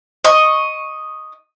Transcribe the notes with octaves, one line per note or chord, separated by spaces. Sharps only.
D#5 C#6